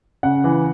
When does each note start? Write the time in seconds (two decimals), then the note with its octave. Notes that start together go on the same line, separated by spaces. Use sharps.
0.23 C#3 F#5
0.44 E3